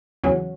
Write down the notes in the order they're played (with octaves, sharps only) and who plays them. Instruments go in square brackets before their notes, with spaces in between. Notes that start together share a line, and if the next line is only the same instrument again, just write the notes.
[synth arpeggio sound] E2 C#3 F#3 C#4 F#4